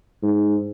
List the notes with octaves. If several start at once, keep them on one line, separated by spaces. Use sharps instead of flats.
G#2